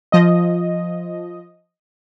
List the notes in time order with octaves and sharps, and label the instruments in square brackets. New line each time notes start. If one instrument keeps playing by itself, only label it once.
[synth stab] F3 D#5